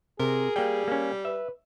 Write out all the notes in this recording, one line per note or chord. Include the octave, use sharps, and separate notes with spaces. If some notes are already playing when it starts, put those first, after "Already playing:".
C3 G#4 A#4
G3 A#3 G5
A#3 C#4
B4 E5